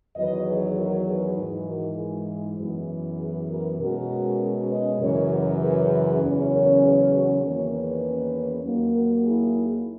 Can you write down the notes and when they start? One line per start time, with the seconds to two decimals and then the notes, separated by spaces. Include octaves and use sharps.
0.16 E2 D#3 F#3 B4 D#5
0.47 G#4 B4
0.77 F#4 A#4
1.07 G#4 B4
1.38 G#2 E3 G#3 D#4
1.68 F#4 A#4
1.98 E4 G#4
2.59 F#2 E3 B3
3.19 G#4 B4
3.49 F#4 A#4
3.80 B2 G#3 C#4 F#4 A#4
4.70 B4 D#5
5.00 F#2 C#3 E3 A#4 C#5
5.31 F#4 A#4
5.61 G#4 B4
6.21 E2 C#3 F#3 C#4
6.52 A#4 C#5
6.82 G#4 B4
7.12 F#4 A#4
7.42 E2 D#3 A#3 C#4 A#4 C#5
7.72 G#4 B4
8.64 D#2 D#3 F#3 A#3
8.93 F#4 A#4
9.24 E4 G#4